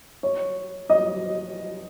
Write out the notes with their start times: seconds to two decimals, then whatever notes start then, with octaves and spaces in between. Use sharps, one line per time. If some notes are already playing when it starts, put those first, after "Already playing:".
0.23 C#5
0.90 D#5